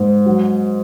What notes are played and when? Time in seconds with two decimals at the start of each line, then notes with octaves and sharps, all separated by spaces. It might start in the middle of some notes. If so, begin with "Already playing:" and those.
Already playing: G#2 A#3
0.26 F#3